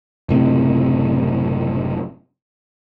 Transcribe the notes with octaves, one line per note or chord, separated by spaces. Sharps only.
F#1 A2 C3